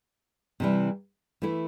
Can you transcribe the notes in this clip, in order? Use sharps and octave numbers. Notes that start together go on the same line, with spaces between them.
C3 E3 G3 E4
E3 A3 E4